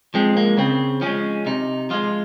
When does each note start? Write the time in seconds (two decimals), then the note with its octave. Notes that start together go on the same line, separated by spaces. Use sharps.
0.14 F3 G#3 C4
0.37 A#3
0.58 C#3 C4
1.01 F3 G#3 C#4
1.46 C3 D#4
1.90 F3 G#3 F4